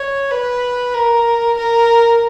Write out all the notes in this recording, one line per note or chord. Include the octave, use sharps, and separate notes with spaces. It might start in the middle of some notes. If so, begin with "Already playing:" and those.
Already playing: C#5
B4
A#4
A#4